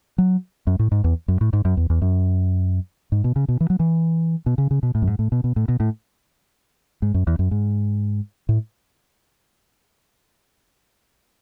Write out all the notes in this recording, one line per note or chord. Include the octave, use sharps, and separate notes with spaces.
F#3
F#2
A2
G#2
E2
F#2
A2
G#2
F#2
E2
E2
F#2
G#2
B2
C#3
B2
E3
F#3
E3
B2
C#3
C#3
B2
A2
F#2
G#2
A2
B2
B2
A2
B2
A2
G#2
F#2
E2
F#2
G#2
A2